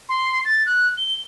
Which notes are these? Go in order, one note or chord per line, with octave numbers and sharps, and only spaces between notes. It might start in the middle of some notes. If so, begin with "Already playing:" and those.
C6
A6
F#6
G7